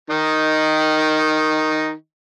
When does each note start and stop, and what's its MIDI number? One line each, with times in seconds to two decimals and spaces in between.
0.10 1.93 51
0.10 1.93 63